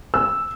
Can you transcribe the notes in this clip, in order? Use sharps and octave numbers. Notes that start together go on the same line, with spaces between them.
E6